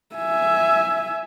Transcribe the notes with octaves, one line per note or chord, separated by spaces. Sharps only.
E5 G#5